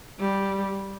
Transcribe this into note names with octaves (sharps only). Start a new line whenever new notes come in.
G3